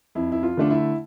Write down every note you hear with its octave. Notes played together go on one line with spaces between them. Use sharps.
F2 E4
E4
F4
D3 A3 D4
E4